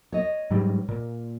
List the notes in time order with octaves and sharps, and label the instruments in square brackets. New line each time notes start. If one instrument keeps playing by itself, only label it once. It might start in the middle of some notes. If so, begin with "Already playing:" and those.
[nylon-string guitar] C#5 D#5
[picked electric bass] G#2 F#3 G3
A#2